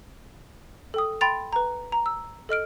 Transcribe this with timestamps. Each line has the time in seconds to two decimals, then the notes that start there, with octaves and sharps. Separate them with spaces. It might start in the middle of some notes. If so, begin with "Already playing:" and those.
0.94 A4 G5 D#6
1.21 G5 B5 C6 A6 F7
1.53 B4 A#5
1.92 A#5
2.06 E6
2.49 A4 D#5 F6 D7